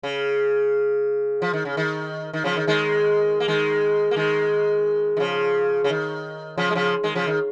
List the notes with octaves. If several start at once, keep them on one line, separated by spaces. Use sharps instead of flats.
C#3
F3
D#3
C#3
D#3
D#3
C#3 F3
D#3
D#3 G#3
A#3
D#3 G#3
A#3
D#3 G#3
D#3
C#3 F3
C#3
D#3
C#3 F3
G#3
C#3 F3
D#3 G#3
C#3 F3
D#3